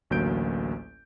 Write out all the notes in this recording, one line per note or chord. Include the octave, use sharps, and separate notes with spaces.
A1 D2 F#3 A#3 G6 D7